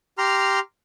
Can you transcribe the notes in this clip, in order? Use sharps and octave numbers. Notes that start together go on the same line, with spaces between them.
G4 A#5 C6 F6